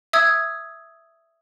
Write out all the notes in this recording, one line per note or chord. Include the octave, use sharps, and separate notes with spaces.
E5 D#6 E6 G#6